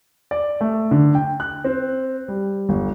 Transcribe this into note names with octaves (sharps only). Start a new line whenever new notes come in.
D5
A3
D3
G5
F#6
C4
G3
G1